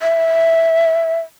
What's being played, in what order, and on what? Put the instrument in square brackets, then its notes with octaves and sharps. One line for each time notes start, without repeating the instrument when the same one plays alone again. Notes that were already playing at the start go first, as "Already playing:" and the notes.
[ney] E5